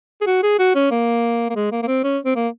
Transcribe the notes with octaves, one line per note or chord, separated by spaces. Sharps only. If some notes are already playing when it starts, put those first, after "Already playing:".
G#4
F#4
G#4
F#4
C#4
A#3
A#3
G#3
A#3
A#3
C4
C#4
C4
A#3